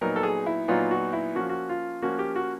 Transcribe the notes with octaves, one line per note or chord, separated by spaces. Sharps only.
A#2 F#3 B3 D#4 A#4
A4
G#4
E4
A#2 F#3 B3 D#4 F4
F#4
E4
F3 A#3 C#4 F#4
F4
F#4
F4
F3 A#3 C#4 F#4
G4
F#4